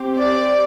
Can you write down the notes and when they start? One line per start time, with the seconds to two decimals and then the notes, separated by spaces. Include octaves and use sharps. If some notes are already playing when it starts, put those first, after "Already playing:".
Already playing: C4 G4
0.18 D5